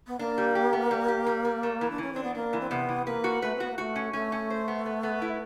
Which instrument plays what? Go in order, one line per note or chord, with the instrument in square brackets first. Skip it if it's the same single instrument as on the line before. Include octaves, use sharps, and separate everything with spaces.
[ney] B3
[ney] A#3 [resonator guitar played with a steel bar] D4
[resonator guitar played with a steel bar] G3
G4
B3
G3
G4
G3
G3
A3
E3
[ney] D4
[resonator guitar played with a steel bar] E3 [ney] C#4
[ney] C4 [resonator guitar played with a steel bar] D4
[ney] B3
[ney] A#3 [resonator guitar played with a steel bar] D4
[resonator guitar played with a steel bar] E3
[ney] C4
[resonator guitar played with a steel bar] C3 [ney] B3
[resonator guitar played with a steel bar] E3
[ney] A#3 [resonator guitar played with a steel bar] B4
[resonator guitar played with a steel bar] F#4
[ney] A3 [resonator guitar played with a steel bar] B4
[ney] C4
[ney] B3 [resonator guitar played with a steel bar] F#4
[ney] A#3
[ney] A3 [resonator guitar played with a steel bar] F#4
[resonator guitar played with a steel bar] C#4
[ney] A3 [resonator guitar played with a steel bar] C#4
[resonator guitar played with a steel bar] C#4
C5
B3
B3
B3
E4